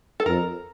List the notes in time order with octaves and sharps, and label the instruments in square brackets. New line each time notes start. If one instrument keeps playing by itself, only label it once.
[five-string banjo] A4
[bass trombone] F2 [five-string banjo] A#4